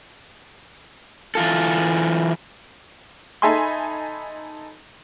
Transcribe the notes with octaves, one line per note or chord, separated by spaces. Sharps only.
E3 F4 A4
D#4 A4 E5 G#5 B5 C6